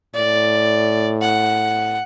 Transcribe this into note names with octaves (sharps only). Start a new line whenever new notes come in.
A2 D5
F#5